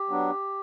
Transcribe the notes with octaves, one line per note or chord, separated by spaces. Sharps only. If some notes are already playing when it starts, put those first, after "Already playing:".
Already playing: G4
F#3 B3 D4